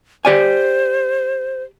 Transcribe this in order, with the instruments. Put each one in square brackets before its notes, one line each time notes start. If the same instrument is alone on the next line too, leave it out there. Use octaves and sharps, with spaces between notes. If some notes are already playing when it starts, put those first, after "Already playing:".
[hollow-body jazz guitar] G4 D5 G#5 [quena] C5